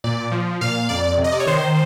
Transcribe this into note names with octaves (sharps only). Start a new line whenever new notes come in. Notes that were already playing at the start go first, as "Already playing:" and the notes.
A#2 D5
F3
A#2 F5
F2 D5
C3
D#5
D5
C#5
D#3 C5